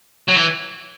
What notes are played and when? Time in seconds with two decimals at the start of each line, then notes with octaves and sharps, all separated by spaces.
0.29 F#3
0.37 E3